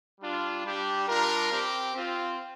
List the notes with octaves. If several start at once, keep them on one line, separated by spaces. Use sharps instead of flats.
G3 D4 F4
G3 D4 G4
G3 D4 F4 A#4
C4 G4
C4 F4